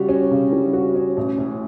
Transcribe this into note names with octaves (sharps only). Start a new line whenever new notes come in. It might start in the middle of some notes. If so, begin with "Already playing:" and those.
Already playing: C#3 G3 F#4
C#4
C#3
G3
F#4
C#4
A1
A2